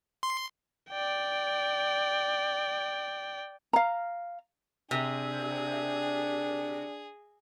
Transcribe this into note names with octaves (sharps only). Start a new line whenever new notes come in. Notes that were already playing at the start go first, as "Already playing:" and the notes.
C6
D5 G5
F5 A#5
C3 D4 G#4